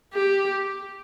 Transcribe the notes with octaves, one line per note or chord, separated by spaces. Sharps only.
G4